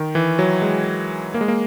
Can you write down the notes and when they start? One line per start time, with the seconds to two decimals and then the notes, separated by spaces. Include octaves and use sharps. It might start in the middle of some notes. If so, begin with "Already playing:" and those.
Already playing: D#3
0.15 E3
0.39 F#3
0.62 G#3
1.34 A#3
1.41 G#3
1.48 A#3